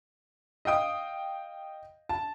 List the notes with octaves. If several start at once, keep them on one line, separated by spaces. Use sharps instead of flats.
D#5 F5 G5 D#6
A5